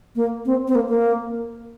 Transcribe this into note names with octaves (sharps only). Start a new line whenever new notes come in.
A#3
C4
C4
A#3
A#3